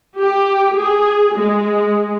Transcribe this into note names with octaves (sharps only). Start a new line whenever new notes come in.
G4
G#4
G#3